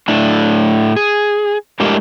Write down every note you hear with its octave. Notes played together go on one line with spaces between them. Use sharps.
A2 A3 D4
G#4
A2 G#3 A3 D4 G4 A#4